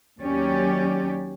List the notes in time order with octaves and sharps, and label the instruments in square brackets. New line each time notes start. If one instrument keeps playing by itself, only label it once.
[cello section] D#2 F#3 C#4 G4 D5